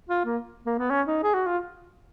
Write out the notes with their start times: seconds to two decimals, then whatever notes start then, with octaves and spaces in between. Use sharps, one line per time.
0.10 F4
0.25 A#3
0.66 A#3
0.79 B3
0.91 C#4
1.07 D#4
1.23 G#4
1.34 F#4
1.46 F4